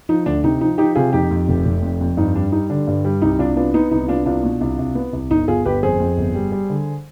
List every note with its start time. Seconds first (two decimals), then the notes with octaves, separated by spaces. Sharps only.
0.09 F3 D#4
0.26 D2 D4
0.44 C3 D#4
0.61 F3 D#4
0.78 F3 D#4 G4
0.95 C3 F4 G#4
1.13 F2 D#4 G4
1.31 F2
1.48 F1
1.65 F1
1.83 F2
2.01 F2
2.17 G2 D#4
2.35 G3 D4
2.52 G3 D#4
2.70 D3 D4
2.88 G2
3.05 G3
3.22 C2 D#4
3.39 C2 D4 F4
3.56 B3 D4 F4
3.74 B3 D#4
3.91 C2 D#4
4.08 B3 D4 F4
4.26 C2 D4 F4
4.44 B2
4.61 C2
4.79 C2
4.95 B3
5.13 C2
5.31 G1 D#4
5.48 G1 F4 G#4
5.65 G1 G4 B4
5.83 F2 G#4 C5
6.00 F2
6.18 G1
6.35 G3
6.52 G3
6.70 D3